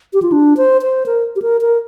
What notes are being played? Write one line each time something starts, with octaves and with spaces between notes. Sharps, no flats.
G4
F4
D4
C5
C5
A#4
G4
A#4
A#4